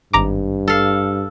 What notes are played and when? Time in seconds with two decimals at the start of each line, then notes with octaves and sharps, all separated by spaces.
0.13 G#1 G2 A#5 D6
0.68 A4 F5